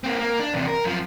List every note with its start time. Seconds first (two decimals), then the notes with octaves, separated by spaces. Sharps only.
0.04 A#3 C4
0.19 A#3
0.40 D4
0.54 E2 C3
0.68 A#4
0.84 F#2 F3